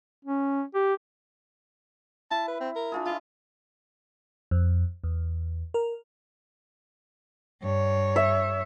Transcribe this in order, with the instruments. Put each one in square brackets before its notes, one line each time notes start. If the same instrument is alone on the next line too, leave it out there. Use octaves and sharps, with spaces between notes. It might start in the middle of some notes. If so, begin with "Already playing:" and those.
[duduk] C#4
G4
[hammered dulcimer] E4 [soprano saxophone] A5
[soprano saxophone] B4
C4
A#4
[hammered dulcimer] D4 F4 G#4
[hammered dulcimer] E4 D#5 [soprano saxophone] F4
[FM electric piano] F2
E2
A#4
[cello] G2 C#5
[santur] E5